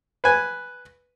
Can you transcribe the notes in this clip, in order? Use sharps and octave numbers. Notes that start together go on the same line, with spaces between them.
B4 G#5